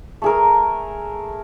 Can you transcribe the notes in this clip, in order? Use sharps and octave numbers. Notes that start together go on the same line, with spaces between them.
A3 G#4 A#4